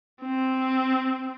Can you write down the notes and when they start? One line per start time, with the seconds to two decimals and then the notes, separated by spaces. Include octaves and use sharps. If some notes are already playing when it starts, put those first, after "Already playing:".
0.22 C4